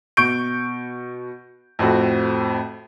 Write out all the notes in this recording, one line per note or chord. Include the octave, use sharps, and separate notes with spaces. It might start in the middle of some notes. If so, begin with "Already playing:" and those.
B2 C#6 G6 D7
F2 A2 C4 F#4